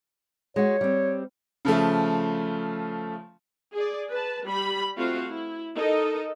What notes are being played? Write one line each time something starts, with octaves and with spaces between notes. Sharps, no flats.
G#3 F#4 C#5
G3 C4
C#3 F3 A3
G#4 D5
B4 A5
G3 B5
A3 C4 F4 F#4 C5 F5
E4
D#4 A4 A#4 D#5